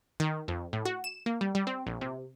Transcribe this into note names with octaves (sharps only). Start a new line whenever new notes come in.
D#3
F2
A2
F#4
E7
A#3
G3
G3
C4
A#1
C3